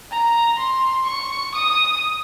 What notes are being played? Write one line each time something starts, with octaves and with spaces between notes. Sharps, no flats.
A#5
C6
C#6
D#6